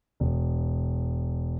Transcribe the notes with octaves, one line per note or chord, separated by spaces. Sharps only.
E1